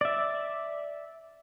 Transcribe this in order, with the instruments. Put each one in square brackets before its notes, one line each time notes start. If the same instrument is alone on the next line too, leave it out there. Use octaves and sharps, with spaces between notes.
[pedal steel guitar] D5 E5